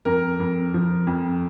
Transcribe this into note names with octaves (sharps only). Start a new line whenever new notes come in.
F2 A#4
F2
F3
F2